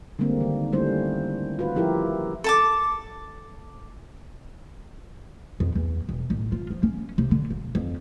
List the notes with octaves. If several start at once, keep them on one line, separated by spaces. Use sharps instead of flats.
D3 G3 G#3 A#3 C4
D#3
G3 A3 A#3 C#4 E4 C5
F4 F#4 B4
F3 E4 G4 A#4
A4 A5 D6
F2
E2
E1
A1
F4
F3
C#4
C3
D3
E1
F2